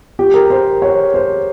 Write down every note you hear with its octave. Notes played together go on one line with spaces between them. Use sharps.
G4
A#4
C5
C#5
C5